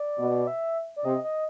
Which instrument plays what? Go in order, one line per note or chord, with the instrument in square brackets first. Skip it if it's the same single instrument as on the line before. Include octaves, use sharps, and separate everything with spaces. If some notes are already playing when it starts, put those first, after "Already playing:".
Already playing: [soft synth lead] D5
[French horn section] B2
[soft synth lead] E5
D5
[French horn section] C3 [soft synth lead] D#5
[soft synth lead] D#5